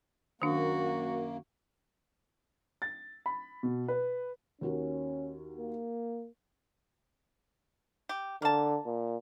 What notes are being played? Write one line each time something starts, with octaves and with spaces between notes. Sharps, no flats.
F#2 D#3 A#3 D4 F#4
A6
B5
B2
B4
D#2 C#4 F#4 A#4
A#3
G4
D3 A#3 A5
A#2